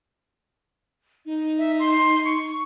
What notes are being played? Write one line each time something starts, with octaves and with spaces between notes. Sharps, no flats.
D#4
E5
C6
C#6